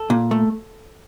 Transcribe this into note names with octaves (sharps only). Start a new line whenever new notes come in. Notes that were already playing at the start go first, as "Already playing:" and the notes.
Already playing: A4
A#2
A3